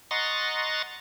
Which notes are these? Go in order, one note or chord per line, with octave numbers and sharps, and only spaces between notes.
D#5 F#5 A#5 C6 C#6 A6